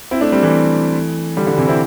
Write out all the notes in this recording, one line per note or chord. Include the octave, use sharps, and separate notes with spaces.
C4 E4
A3 D4
G3 C4
E3 A3
D3 G3
D3 G3
C3 E3
C4 E4